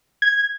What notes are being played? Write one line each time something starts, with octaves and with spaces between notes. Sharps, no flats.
G#6